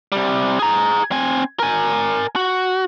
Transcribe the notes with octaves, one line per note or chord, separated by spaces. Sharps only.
C3 G3
G#4 A#5
C4 G#5
A#4 G#5
F#4